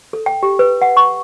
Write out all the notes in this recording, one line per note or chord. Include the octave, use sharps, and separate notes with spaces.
A4
G5
G4
B4
F#5
C#6